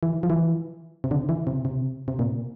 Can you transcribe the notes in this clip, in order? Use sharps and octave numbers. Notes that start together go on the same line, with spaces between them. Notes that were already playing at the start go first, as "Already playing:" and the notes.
E3
F3
E3
C3
D3
E3
C3
C3
C3
A#2